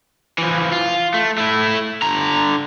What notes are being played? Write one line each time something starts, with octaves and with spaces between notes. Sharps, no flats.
E3 F3
F4
A3
A3 E4
D3 A#5